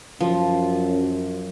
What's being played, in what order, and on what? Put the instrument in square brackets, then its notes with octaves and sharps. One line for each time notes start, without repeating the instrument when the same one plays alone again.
[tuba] F#2 [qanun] F3